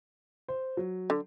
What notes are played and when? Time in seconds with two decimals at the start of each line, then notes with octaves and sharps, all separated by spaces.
0.48 C5
0.77 F#3
1.10 D3